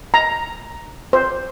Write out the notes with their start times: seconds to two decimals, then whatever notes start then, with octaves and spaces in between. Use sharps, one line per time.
0.14 A#5
1.13 C5